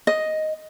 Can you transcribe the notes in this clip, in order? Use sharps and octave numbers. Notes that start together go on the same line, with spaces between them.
D#5